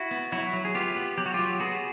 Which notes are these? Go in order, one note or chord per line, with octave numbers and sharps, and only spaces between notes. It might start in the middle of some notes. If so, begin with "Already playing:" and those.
Already playing: E4 F#4
B3
F#3 E4 F#4
F#3
G#4
B3 F4 G4
B3
F#3 G4
F#4
F#3 F4 G4
B3 F#4 G#4